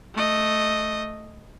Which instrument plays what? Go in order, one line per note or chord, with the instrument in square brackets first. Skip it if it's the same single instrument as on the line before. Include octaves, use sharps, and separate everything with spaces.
[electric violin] A3 D#5